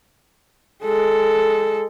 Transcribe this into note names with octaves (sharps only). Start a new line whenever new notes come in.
G#3 A4